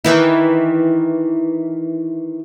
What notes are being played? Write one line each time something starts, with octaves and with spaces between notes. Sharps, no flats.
D#3 E3 E4